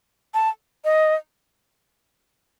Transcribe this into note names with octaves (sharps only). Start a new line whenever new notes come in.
A5
D#5